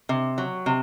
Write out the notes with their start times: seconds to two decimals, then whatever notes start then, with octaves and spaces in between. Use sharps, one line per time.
0.09 C3
0.38 F#3
0.66 C3